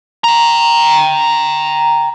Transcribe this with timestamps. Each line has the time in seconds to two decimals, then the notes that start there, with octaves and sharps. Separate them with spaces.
0.24 G5 A#5